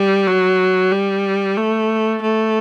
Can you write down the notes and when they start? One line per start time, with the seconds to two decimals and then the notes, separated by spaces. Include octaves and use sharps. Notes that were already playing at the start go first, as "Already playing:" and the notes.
Already playing: G3
0.27 F#3
0.92 G3
1.57 A3
2.22 A3